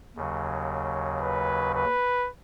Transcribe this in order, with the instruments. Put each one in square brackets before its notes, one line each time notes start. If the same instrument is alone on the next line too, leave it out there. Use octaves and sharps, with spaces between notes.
[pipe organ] D#2 C#3 F#3
[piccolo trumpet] B4
B4